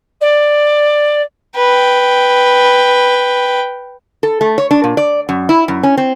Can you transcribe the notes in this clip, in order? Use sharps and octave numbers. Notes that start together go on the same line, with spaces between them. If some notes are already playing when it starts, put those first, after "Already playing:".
D5
B4 G5
A4
A3
C#5
D4
A#2
D5
F#2
E4
F#2
C#4
C4